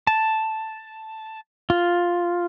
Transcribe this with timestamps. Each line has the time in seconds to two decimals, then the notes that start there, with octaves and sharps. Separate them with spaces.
0.07 A5
1.70 F4